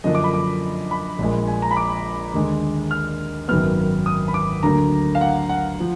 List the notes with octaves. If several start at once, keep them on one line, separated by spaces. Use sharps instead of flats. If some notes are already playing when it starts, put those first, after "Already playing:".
F#2 D3 F3 A#3 D4 D#5
D6
B5
D6
B5
A#1 A#2 G#3
G#5
A#5
B5
D6
D#2 D3 G#3
F6
G#1 F#2 D#3 F#3 B3 F6
D#6
B5
D6
D2 D3 F#3 A#3 A#5
F5
F#5
F#5
F3